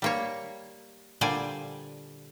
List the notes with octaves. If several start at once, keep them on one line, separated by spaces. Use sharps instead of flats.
G3 A#3 C#5
A#2 D3 G3 C5 D5 G#5